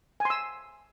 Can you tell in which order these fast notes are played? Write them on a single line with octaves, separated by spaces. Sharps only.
G#5 C6 E6